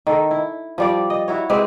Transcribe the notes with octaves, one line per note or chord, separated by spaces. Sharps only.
D#3 A4
E4
F3 G3 D5
D#5
E4 F#4 C#5
G#3 C4 G4 B4